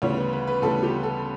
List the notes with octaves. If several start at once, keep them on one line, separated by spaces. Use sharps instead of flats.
D2 C#3 E3 G3 B3 C#5
B4
B4
B4
D2 C#3 E3 G3 B3 A4
G4
A4